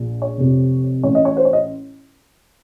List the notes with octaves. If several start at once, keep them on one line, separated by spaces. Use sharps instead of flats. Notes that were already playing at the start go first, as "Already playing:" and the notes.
Already playing: A#1 A#2
C#5
F1 F2 C3
A1 A2 C#5
D#5
C#5
C5
C#5
D#5